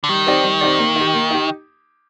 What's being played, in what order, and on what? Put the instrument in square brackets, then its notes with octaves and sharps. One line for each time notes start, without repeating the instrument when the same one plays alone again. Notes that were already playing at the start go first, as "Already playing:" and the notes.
[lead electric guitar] D3
[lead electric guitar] D#3 [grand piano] G3
[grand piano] C4 D#4 G4 D5
G3
C4 D#4 G4 D5
A#3
D#4
G4
A#3
D#4 G4